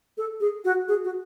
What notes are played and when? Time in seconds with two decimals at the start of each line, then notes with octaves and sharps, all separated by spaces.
0.17 A4
0.40 G#4
0.65 F#4
0.88 G#4
1.04 F#4